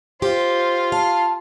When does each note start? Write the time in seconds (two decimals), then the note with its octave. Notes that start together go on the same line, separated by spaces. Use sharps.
0.22 F4 G4 C5
0.92 F5 A5